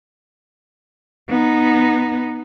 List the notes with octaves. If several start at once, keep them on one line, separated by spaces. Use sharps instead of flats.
B3 D#4